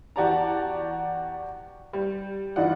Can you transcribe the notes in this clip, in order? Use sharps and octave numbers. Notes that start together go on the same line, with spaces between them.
E2 F#4 G4 D5 A5 A#5
G3
G2 E3 D#4 F4 D5 F#5